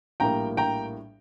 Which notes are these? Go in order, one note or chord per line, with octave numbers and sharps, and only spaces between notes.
A#1 A2 G3 A#3 G5 A#5
G5 A#5